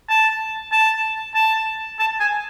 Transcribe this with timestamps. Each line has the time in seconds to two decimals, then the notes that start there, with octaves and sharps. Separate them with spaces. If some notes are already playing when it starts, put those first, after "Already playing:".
0.09 A5
0.72 A5
1.35 A5
1.99 A5
2.20 G#5